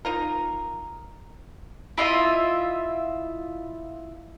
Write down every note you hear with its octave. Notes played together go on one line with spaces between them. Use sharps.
D#4 F4 A#4
E4 F4 D#5 E5